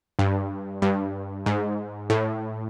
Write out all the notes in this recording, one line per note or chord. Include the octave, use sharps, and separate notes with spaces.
G2
G2
G#2
A2